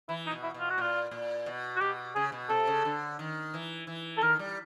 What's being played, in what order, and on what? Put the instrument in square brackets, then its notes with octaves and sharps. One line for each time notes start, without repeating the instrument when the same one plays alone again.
[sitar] E3 [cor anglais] E4
[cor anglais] D#4
[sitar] B2
[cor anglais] E4
[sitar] B2
[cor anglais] F4
F#4
[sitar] A#2 [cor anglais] F4
[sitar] A#2
B2
[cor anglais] F#4
[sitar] B2 [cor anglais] G4
[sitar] C#3 [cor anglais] G#4
[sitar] B2
[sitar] C3 [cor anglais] A4
[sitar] C#3
D3
D#3
E3
E3
[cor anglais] A4
[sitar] D#3 [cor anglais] A#4
[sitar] G3